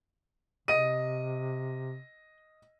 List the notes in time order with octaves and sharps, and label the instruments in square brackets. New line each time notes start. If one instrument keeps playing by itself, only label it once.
[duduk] C3 [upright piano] D#5 D#7